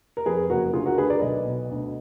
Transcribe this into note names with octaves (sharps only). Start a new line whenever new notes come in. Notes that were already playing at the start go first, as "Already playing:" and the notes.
A#4
F2 G#4 B4
F#1 F#4 A#4
D2 F4 G#4
F#4 A#4
D3 G#4 B4
A#4 D5
B1 B4 D#5
B2
D2